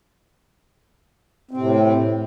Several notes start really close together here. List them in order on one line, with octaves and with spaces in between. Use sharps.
C4 C3 A2